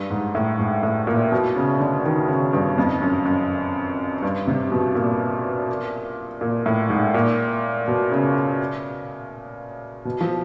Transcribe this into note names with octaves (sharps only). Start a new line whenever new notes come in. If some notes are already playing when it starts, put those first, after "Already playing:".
Already playing: G2
G#2
A2
G#2
A2
A#2
B2
C#3
D3
D#3
C#3
G2
F2
F#2
F#2
G2
C3
B2
A#2
A#2
A2
G#2
A#2
B2
C#3
B2
F3